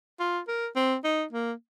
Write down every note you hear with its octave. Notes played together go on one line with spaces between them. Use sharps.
F4
A#4
C4
D#4
A#3